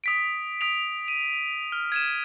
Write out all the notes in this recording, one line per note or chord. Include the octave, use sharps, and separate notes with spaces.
D#6 B6 D7
D#6 B6 D7 F7
D#7
F6
G#6 D#7 E7